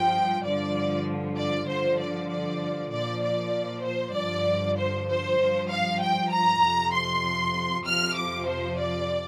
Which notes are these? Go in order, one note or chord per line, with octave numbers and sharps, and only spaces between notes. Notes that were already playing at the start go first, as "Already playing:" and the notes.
Already playing: G2 F3 G5
G2 D3 F3 D5
D5
G2 D3 F3 C5
D5
D5
A#2 F3 D5
D5
C5
G2 D3 F3 D5
C5
C5
G2 F3
F5
G5
A#5
F2 C3 F3
C6
F2 C3 F3 F6
D6
C5
D5